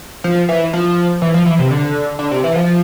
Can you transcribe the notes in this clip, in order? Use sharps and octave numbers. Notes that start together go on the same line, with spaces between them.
F3
E3
F3
E3
F3
E3
C3
D3
D3
C3
E3
F3